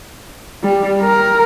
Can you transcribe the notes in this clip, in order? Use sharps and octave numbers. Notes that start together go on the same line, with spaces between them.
G3
A#4